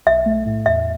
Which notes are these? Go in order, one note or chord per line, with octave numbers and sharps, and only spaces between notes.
B1 E5
A3
A2
E2 E5